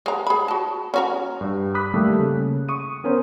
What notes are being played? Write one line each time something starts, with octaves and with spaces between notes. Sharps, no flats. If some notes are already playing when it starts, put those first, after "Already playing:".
G#3 A#5
G#4 B5
F#4 A5
C#4 F#4 A#5
G2
B5 D6 D#6 F#6 B6
D#3 G3 A3 A#3 G4 A4
C#3
C#6 D#6 D#7
B3 C#4 A#4 C5 C#5